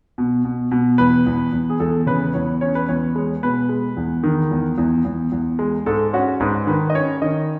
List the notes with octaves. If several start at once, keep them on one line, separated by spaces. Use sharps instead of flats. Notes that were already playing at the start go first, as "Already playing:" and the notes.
B2
B2
B2
E2 B4
E2
E2
G#4
E2 A4
C#3 B4
E2 C#5
C#4 C#5
B4
E2 C#5
G#3
B2 B4
G#3
E2
D#3
E2
E2
E2
E2
G#3
G#2 A4
C#4 F#4
G#2 B4
D#3 B4
D#5
C#4 C#5
D#3 D#5